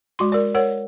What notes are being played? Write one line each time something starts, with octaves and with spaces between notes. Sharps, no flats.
G#3 F#4 C6
A#4 D5
A#4 C#5 F#5